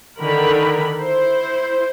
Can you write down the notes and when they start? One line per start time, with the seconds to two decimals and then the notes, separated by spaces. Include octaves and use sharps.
0.21 D3 D#3 A#4 B5
0.97 E4 C5